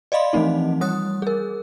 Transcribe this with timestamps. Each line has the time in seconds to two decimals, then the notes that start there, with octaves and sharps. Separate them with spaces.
0.12 D5 D#5 F5 B5 C6
0.33 E3 F3 A3 C4 D#4
0.81 G3 D#6 F#6
1.22 G#4 A#4